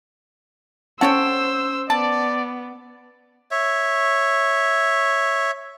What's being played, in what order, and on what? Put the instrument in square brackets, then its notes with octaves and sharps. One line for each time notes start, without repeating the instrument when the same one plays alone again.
[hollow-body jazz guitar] C#4 F#5 [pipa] A4 C#5 G5 [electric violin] C5 E6
[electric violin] B3 [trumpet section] D5 [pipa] A5
[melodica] C#5 E5